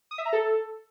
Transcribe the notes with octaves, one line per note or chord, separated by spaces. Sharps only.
D#6
E5
A#5
A4